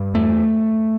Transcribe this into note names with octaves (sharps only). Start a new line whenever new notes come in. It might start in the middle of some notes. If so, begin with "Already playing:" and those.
Already playing: G2
E2 A3